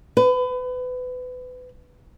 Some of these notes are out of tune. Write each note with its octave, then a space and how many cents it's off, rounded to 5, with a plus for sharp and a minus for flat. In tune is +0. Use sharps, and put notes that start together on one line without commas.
B4 +30